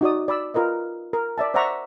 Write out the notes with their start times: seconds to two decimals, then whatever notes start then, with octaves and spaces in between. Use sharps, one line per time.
0.01 D#4 F#4 D5 D#6
0.28 D5 B5 E6
0.54 F4 A#4 B4 D#5
1.13 A#4
1.38 D5 E5 A5
1.54 C5 D5 E5 F#5 A#5 C#6